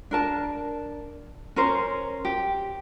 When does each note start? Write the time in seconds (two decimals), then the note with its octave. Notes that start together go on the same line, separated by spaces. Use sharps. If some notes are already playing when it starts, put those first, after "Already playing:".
0.11 D4 A#4 A5
1.56 C#4 A#4 C5
2.25 G4